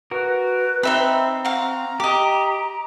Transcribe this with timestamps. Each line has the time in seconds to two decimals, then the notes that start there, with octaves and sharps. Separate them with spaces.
0.11 F#4 A#4 B4
0.83 C4 D#4 E5 B5
1.45 F#4 F5 A#5
2.00 G4 D#5 D6